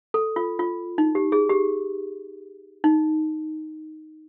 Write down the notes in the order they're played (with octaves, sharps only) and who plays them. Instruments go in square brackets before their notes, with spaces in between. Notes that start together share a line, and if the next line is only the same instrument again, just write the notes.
[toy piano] A4
F4
F4
D#4
G4
G#4
G4
D#4